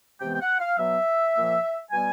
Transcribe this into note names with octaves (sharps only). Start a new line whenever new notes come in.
C3 E3 G#3 B3 G5
G5
F#5
F5
B2 F#3 B3 E5
A#2 F3 A#3
B2 G3 B3 G#5